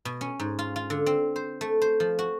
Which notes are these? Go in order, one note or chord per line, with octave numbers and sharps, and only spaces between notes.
B2
C#4
G#2
F4
F4
D3
C4
C5
A3
C5
F3
F#4